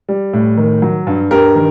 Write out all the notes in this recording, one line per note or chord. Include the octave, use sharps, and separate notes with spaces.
G3
A2
D#3
F#3
G2
G2 G4 A#4
D#3